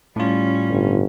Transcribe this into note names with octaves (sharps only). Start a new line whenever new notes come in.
A2 G3 C#4 F4
G1